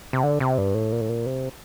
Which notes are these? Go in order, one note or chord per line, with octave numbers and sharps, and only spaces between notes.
C3
D3
C3
G2
A2
A#2
A2
A#2
C3